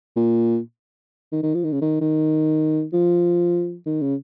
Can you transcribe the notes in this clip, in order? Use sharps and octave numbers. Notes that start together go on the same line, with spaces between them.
A#2
D#3
D#3
F3
D#3
C#3
D#3
D#3
F3
D#3
C#3